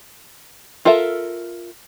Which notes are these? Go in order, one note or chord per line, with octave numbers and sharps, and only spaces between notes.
F4 A4 A#4 E5